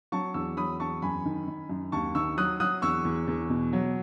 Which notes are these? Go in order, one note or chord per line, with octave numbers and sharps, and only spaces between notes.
F#3 A5 C#6
E2 C#6 E6
F#3 B5 D#6
E2 A5 C#6
F#2 G#5 B5
D#3
D#3
F#2
D#2 A5 C#6
D#3 C#6 E6
F#3 D#6 F#6
F#3 D#6 F#6
E2 C#6 E6
E2
E2
B2
F#3